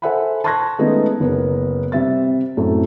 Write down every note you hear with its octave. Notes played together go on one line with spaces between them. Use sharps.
A4 C5 E5 F#5 G#5 B5
A5 C6 C#6 F#6 G#6 A#6
D#3 G#3 A3 B3 C#4 D#4
F#1 B3 A#4
C3 G3 E5 A6
F#2 A2 C3 A3